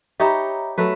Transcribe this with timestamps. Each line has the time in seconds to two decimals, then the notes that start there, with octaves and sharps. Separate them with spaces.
0.20 D#4 G4 C#5 E5 A#5 B5
0.78 F#3 A3 B4